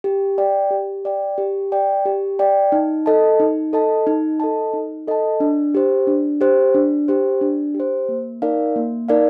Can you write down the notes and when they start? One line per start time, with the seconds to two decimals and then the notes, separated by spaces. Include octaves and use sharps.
0.04 G4
0.38 D5 G5
0.71 G4
1.05 D5 G5
1.38 G4
1.72 D5 G5
2.06 G4
2.39 D5 G5
2.72 D#4
3.06 A4 D#5 A5
3.40 D#4
3.73 A4 D#5 A5
4.07 D#4
4.40 A4 D#5 A5
4.73 D#4
5.08 A4 D#5 A5
5.40 D4
5.75 G4 C5
6.07 D4
6.41 G4 C5
6.74 D4
7.08 G4 C5
7.41 D4
7.74 G4
7.80 C5
8.09 A#3
8.42 D#4 A#4 D5 F5
8.76 A#3
9.08 D#4 A#4 D5 F5